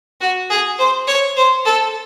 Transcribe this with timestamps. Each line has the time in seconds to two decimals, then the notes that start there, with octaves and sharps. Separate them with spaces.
0.21 F#4
0.50 G#4
0.79 C5
1.07 C#5
1.36 C5
1.65 A4